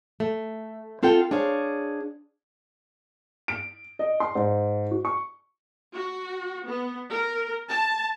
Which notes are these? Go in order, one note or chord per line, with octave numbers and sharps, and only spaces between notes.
A3
C4 F4 A4 F#5 G5
D4 G#4 C5 C#5 F5
D7
D#5
C6
G#2
F#4
C#6
F#4
B3
A#4
A5